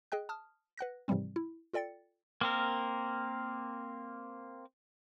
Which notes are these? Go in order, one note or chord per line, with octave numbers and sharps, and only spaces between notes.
G#4 D#5 G5 F#6
A5 D#6 F6
B4 F#5 F#6 A#6
G#2 C3 E3 F3 G3 C4
E4
F4 A4 D5 G5 A6 C#7
A#3 C4 A#4